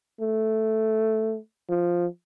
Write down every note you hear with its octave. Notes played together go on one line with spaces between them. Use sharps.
A3
F3